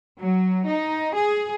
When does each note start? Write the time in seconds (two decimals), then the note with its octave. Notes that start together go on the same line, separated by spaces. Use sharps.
0.21 F#3
0.67 D#4
1.14 G#4